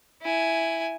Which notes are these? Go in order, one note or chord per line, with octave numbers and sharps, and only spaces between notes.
E4 G#5